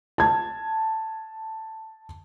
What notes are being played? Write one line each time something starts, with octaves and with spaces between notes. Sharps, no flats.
A5 G#6